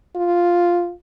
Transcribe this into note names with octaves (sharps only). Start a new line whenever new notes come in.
F4